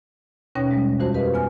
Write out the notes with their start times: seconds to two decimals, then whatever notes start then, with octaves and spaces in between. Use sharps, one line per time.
0.55 D#2 B2 C#4 C#5 G5 A#6
0.71 G3 G#3
1.00 F2 E3 F#4 C5 A5
1.14 G4 A#4 B4 D#5 F5
1.34 B3 G#5 F6